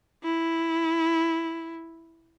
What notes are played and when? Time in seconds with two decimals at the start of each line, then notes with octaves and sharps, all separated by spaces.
0.24 E4